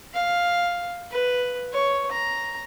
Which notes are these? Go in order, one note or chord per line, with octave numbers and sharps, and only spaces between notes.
F5
B4
C#5
A#5